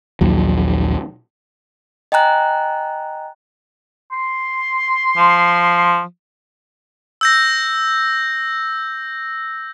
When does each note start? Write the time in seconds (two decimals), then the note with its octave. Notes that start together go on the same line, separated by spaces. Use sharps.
0.21 A#1 D#2 F#3
2.12 D#5 G5 G#5 A#5 F#6
4.12 C6
5.17 F3
7.21 E6 G6 A#6